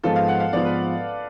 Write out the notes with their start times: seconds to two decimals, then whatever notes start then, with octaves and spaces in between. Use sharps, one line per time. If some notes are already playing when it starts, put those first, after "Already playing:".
0.04 G#2 F3 B3 F4 A4
0.16 F5
0.28 F#5
0.40 F5
0.53 G#2 F3 B3 F4 D5
0.65 B4